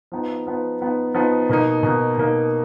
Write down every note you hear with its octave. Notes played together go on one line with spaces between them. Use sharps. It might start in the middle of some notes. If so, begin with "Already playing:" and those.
F3 B3 D#4
F3 B3 D#4
F3 B3 D#4
F3 B3 D#4
B2 A#3 D#4
B2 A#3 D#4
B2 A#3 D#4